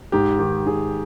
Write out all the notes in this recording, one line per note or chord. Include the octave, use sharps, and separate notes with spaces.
G#2 G4
D#3 G4
D#3 G#4